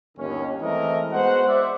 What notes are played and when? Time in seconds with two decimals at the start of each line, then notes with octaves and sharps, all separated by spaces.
0.17 G1 D#2 C#4
0.61 E3 G#3 A3 C4 A#4 D#5
1.11 G#3 B3 F#4 C5 F#5
1.47 C5 D5 E5